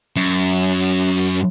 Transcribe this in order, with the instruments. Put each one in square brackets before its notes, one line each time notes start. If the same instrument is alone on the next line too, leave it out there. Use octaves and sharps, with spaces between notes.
[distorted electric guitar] F#2